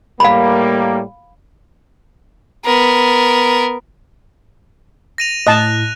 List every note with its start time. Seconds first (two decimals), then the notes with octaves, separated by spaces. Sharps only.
0.20 A2 G3 A#3 F5 B5
2.65 B3 A#4
5.18 A#6 D#7 F7
5.47 A2 D#5 A5 F#6